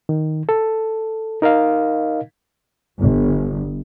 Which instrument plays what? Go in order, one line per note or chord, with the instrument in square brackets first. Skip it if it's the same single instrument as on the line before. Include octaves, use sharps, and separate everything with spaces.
[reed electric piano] D#3
A4
D#4 A#4 D#5 F5
[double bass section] G1